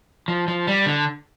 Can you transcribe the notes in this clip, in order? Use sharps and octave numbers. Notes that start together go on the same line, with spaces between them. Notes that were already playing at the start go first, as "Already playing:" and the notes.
F3
F3
G3
D3